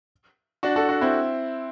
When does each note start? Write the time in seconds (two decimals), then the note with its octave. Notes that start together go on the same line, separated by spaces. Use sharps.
0.63 D4 F#4
0.76 F#4 A4
0.89 D4 F#4
1.01 C4 E4